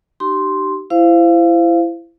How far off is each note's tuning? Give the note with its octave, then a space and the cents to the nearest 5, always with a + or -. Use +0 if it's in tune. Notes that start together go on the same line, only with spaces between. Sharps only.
D#4 -30 G4 -30 C6 +0
E4 +25 C5 -10 F5 -15